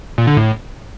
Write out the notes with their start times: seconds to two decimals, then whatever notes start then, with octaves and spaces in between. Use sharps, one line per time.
0.18 A#2
0.27 D3
0.37 A2